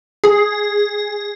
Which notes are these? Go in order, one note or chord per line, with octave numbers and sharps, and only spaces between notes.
G#4